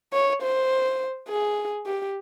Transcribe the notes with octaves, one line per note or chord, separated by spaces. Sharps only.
C#5
C5
G#4
G4